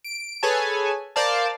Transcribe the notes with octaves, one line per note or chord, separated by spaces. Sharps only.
D7
G#4 A4 B4 C#5 G#5 A5
A#4 C5 D5 F5 A5